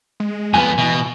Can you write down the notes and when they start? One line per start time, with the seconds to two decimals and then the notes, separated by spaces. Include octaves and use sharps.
0.20 G#3
0.54 F2 B3 G#5
0.78 B2 E3